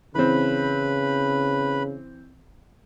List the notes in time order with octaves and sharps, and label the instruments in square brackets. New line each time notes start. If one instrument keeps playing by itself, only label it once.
[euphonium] C#3 [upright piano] E3 C4 [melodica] B4 B5